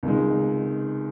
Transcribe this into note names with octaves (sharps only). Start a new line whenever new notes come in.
C#2 C3 D#3 G#3